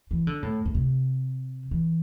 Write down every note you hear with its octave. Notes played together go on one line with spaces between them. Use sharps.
E3
D3
A2
A2
C3
E3